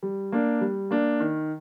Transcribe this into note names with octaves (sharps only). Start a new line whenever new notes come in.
G3
A#3 D4
G3
A#3 D4
D#3